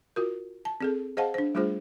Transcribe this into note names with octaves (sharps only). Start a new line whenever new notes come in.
F4 F#4 A#4
A5
C4 G#4 A4
G#4 C5 D#5 F5 F#5 A5
D4 C5
G3 A3 D4 F4 G#4 C5